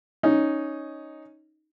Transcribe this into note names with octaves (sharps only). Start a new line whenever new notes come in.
C#4 D#4